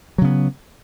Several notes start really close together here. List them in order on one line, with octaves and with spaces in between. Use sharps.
F#3 C#3 B3